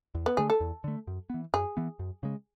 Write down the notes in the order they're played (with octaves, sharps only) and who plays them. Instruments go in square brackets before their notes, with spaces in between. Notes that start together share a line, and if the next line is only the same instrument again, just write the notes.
[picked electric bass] E2
[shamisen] B3
[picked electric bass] D3 A3 [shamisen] G#4
[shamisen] A4
[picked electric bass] E2
D3 A3
F#2
E3 B3
[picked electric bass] F#2 [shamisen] G#4
[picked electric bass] E3 B3
F#2
C#3 G#3